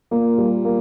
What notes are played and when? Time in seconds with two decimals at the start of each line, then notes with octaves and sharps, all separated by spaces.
0.11 A#2 A#3
0.38 G3
0.65 A#3